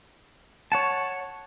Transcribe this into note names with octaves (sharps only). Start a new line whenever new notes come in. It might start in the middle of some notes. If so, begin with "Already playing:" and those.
C#5 F#5 A5